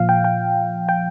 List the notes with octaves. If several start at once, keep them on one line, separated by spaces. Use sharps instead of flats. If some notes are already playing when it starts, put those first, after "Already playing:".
Already playing: A#2 F3 F5
G5
G5
G5